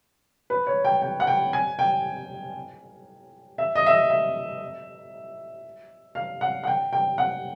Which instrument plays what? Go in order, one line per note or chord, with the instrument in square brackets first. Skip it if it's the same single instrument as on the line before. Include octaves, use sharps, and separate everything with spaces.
[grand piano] B4
C#5
G5
G5
F#5
G5
G#5
G5
E5
D#5
E5
D#5
E5
F5
F#5
F#5
G5
G5
F#5